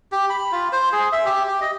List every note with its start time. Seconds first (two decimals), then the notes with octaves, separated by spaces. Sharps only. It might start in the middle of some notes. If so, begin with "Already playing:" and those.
0.12 G4
0.30 B5
0.52 F4
0.73 C5
0.92 G#4
1.12 E5
1.26 G4
1.47 G4
1.61 D#5